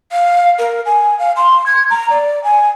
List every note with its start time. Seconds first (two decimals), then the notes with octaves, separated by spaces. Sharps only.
0.12 F5
0.59 A#4
0.86 G#5
1.19 F5
1.37 C6
1.66 G#6
1.90 A#5
2.10 D5
2.44 G#5